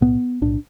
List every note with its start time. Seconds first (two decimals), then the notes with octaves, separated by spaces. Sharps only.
0.01 B1 A2 B3
0.41 B1 A2 D4